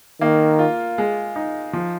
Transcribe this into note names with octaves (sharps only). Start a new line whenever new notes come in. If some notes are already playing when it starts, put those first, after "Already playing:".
D#3 A#3
F4
G#3
D#4
F3